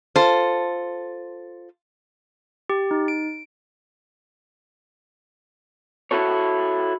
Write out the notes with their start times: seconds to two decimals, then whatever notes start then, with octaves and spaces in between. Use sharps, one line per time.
0.16 F4 A4 C5
2.70 G4
2.91 D#4
3.08 D7
6.11 E4 F#4 A4 C#5